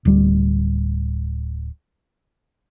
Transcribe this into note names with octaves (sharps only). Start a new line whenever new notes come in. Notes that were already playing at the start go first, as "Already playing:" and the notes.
D1 G3